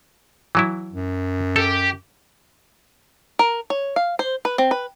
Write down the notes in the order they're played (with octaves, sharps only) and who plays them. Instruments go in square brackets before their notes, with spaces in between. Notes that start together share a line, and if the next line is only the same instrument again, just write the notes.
[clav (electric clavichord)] E3 F#3 E4
[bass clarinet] F#2
[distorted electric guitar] G4 [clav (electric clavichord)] A4
[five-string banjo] A#4
C#5
F5
C5
B4
C4
B4